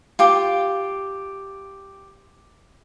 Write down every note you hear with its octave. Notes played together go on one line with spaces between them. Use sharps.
F4 G4 D6